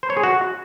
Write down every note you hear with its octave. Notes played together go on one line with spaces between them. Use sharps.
C5
C#5
G#4
F#4